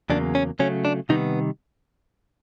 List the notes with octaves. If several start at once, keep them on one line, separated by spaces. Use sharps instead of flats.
E2 C#3 F#3 A#3 D4
C#4
C#3 F#3 A3 C#4
D4
C3 D#3 G3 B3 D#4